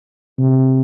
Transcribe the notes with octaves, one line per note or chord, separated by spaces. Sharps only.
C3